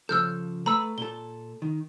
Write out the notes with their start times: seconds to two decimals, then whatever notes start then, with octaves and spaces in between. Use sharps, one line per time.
0.09 C#3 F3 A4 E6 F6 G6
0.66 A3 A4 B4 A#5 B5 E6
0.98 A#2 A4 G7
1.62 D#3